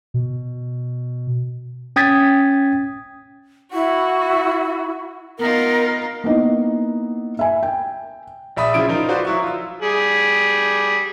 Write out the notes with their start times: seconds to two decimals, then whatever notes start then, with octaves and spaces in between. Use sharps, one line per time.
0.14 B2
1.96 C#4 G5 D#6 G#6 A6 B6
3.73 E4 F#4
5.38 B3 D#4 F4 A#4
6.24 A#3 B3 D#4 E4
7.39 E5 G#5
7.63 G5
8.56 A#1 D5 E5 B5 D#6
8.74 C#3 F3 E4 D7
8.89 F3 D#4 A#4
9.08 F4 F#4 B4 C5 D5
9.25 F#3 E4 C#6
9.43 F4 E6
9.82 G3 G#4